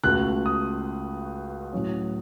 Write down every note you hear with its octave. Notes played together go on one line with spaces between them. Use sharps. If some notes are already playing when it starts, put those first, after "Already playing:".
C#2 B2 A3 F#6
D#6
A2 F#3 C#4